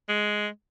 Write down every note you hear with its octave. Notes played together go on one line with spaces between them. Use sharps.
G#3